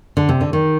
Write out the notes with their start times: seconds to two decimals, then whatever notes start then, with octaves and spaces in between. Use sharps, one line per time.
0.17 D3
0.29 C3
0.41 D3
0.53 D#3